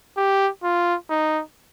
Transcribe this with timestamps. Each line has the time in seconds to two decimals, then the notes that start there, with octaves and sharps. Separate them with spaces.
0.17 G4
0.63 F4
1.09 D#4